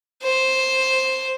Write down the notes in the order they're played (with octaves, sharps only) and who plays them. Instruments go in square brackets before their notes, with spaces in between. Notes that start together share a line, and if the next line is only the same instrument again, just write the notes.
[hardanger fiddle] C5